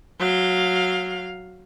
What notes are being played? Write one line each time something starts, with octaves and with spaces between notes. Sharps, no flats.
F#3 F5